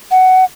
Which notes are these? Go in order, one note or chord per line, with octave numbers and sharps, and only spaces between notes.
F#5